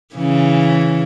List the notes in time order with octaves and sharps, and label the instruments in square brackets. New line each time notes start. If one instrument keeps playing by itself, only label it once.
[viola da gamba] C#3 E3